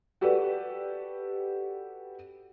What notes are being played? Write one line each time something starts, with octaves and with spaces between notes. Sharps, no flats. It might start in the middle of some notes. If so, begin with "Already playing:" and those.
F#4 G4 A4 B4 D5